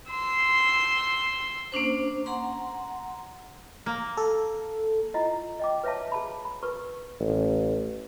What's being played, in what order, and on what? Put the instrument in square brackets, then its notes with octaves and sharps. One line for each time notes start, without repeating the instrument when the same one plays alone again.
[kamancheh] C6 E6
[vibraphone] A#3 C#4 D4 C5
F#5 A#5 C6
[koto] A#3
[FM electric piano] A4
[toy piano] E4 F4 D#5 F#5
D#5 G5 D6
B4 C#5 E5 F5 A5
G#4 A5 B5
B5
A#4 B4 C#6
[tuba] A1